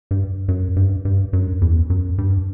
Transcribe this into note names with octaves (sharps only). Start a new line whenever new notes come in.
G2
F#2
G2
G2
F#2
E2
F#2
G2